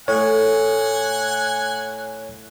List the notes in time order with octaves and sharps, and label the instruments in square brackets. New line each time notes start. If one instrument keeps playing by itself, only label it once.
[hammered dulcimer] A2 [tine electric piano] C#5 [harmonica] F#5 G#5